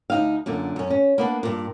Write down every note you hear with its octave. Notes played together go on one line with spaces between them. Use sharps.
D2 D#4 F5
F#2 A#2 D3
F#2 C#4
C#4
A#3 B3 D4
G2 A#2